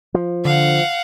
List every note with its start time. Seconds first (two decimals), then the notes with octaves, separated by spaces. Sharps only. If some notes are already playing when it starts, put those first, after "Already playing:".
0.14 F3
0.45 D3 F5 F#5